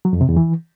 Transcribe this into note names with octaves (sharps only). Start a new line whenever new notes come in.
F#3
F2
C3
E2
E3